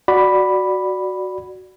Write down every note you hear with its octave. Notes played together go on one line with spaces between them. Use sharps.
F#4 D5 B5